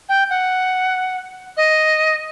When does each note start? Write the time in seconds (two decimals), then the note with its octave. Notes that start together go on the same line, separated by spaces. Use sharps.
0.09 G5
0.30 F#5
1.57 D#5